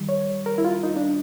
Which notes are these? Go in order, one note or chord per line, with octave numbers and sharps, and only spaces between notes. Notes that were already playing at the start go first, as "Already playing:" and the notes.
Already playing: D#3 G3
C#5
A#4
E4
F4
D#4
D4